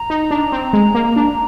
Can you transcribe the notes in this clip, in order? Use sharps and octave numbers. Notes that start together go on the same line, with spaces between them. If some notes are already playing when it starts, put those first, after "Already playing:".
Already playing: A#5
D#4
D4
C4
G#3
A#3
D4